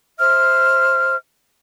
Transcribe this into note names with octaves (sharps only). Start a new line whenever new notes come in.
C5 E5 F6